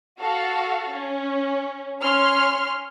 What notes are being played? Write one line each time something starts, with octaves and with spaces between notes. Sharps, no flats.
F#4 A4 F5
C#4
C#4 C#5 C6 F6